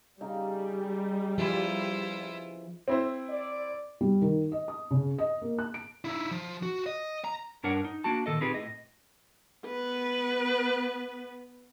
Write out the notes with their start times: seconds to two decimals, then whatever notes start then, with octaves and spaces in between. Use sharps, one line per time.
0.21 C#3 G3 D#4
1.38 E3 F3 E4 F4
2.88 C4 E4 C5
3.29 D5
4.01 G3
4.22 D#3
4.52 D#5
4.68 D#6
4.91 C#3
5.19 D#5
5.42 A#3
5.59 F#6
5.74 D7
6.05 D#4 E4
6.31 F3
6.63 F#4
6.86 D#5
7.24 A#5
7.63 G2 D4 A#4 C#5 F#5
7.85 D#4
8.04 A#3 D4 F#4 A5
8.26 A#2 D#3 A4 D#5
8.41 C4 D#4 F4 G4 G#4 B4
8.54 A2 D#5
9.66 B3 B4